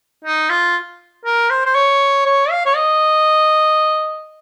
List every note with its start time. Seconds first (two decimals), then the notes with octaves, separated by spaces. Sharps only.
0.24 D#4
0.50 F4
1.25 A#4
1.50 C5
1.65 C5
1.75 C#5
2.25 C#5
2.51 F5
2.66 C#5
2.76 D#5